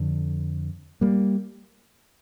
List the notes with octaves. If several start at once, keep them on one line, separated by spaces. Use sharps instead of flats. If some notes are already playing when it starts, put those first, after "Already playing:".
Already playing: F2 D3
G3 A#3